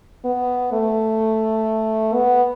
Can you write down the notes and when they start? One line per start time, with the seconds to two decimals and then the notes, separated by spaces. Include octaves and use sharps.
0.25 B3
0.72 A3
2.14 B3